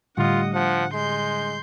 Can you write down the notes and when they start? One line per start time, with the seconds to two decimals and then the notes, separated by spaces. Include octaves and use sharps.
0.17 A2 D3 G3 F4 D#5 F#5
0.54 F3 F#5
0.93 G#3 C6 G6